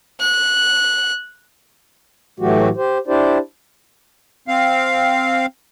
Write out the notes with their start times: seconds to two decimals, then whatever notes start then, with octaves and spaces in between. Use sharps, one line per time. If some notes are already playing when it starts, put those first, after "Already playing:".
0.20 F#6
2.40 A2 E3 F#3 A3 F#4 G4
2.77 G4 C5
3.07 D4 E4 G4 C5 D5
4.48 C4 F5